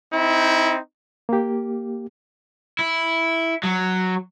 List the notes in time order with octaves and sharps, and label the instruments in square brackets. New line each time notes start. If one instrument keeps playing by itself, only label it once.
[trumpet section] C4 D#4 E4
[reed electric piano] A#3 G4
[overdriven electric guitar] E4
F#3